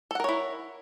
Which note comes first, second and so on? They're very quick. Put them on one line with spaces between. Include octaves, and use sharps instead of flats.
A4 F#5 A#4 C#5 E4